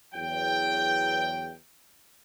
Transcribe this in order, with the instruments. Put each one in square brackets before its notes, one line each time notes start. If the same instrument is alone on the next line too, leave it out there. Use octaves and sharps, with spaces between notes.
[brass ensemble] E2 F#3 G5